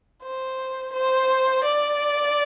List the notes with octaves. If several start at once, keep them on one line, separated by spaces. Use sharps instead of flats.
C5
C5
D5